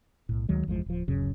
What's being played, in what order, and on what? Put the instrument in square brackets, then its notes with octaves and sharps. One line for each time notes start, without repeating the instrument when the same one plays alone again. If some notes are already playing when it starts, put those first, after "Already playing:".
[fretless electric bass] B1 A2
D2 D#3 F#3 G#3
G1 E2 F3 G#3
D1 F3
D1 F#2 C#3